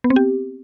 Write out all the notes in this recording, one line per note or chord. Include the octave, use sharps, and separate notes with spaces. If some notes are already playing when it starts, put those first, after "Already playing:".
B3
C4
G4